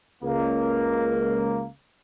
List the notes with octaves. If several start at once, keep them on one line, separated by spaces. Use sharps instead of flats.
C#2 A#3